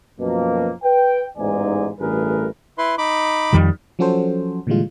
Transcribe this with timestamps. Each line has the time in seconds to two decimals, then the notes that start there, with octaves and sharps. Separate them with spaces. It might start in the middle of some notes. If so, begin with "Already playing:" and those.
0.19 F#2 B2 F3 A#3
0.83 B4 G5
1.37 A1 E2 G#2 D#4 D5 G#5
1.99 A1 G2 A3 G#4 A#4 B4
2.78 E4 B4 C6
2.98 D#4 B5 D6
3.53 F2 D#3 G3
3.99 F3 F#3 C#4 F#4 A4 C5
4.67 A#2 D3 E3 G3 G#3 F4